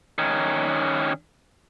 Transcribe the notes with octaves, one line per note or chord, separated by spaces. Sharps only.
D#3 C#4